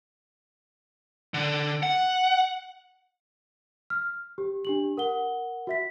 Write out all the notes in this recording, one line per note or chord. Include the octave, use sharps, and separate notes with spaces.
D3
F#5
F6
G4
D4 G4 F#7
A#4 F#5 G7
F#4 E5 B6